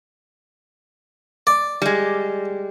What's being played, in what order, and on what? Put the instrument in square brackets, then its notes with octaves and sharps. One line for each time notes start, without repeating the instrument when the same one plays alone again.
[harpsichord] D5
[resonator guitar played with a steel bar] G3 G#3